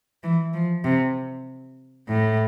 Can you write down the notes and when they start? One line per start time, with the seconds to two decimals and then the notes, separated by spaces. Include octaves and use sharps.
0.23 E3
0.54 F3
0.84 C3
2.09 A2